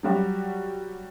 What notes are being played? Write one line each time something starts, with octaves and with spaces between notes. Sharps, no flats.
F#3 G3 F#4 G4